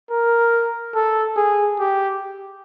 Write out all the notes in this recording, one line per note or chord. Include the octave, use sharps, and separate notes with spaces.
A#4
A4
G#4
G4